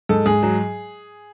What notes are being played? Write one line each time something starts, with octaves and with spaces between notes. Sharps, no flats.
G#2 A4
G#2 G#4
F#3